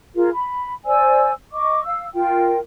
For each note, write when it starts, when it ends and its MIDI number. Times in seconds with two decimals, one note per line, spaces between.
0.15 0.28 65
0.15 0.28 68
0.15 0.28 70
0.33 0.74 83
0.85 1.32 72
0.85 1.32 74
0.85 1.32 80
0.85 1.32 88
1.52 1.83 75
1.52 1.83 85
1.52 1.83 86
1.84 2.07 77
1.84 2.07 88
2.14 2.59 65
2.14 2.59 70
2.14 2.59 79